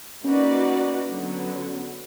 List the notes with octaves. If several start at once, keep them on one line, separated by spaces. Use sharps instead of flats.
A#3 C#4 D#4 F#4 B4 D5
D3 F#3 B3